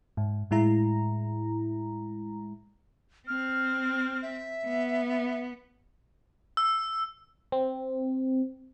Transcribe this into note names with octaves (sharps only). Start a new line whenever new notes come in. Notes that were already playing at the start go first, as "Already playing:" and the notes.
G#2
A2 G#3 E4 A#5
C4 F6
E5
B3
E6
C4